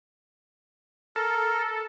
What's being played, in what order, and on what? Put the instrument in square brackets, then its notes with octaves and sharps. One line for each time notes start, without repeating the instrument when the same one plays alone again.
[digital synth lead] A4 [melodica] A#4